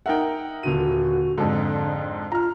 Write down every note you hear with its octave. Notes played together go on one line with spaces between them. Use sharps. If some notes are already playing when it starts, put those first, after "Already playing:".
D#4 A#4 E5 F#5 G5
D#1 D3 F#4 D#7
F2 G#2 D3 A4
F4 A#5 F6